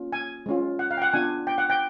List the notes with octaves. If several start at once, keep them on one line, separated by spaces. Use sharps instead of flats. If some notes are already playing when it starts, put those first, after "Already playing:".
Already playing: A#3 C#4 F4
G#5
G#3 C#4 F4
F#5
F5
G5
F#5
B3 D4 F4 G#5
G5
F#5
G5